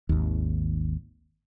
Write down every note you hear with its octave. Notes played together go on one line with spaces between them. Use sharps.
G#1 D#2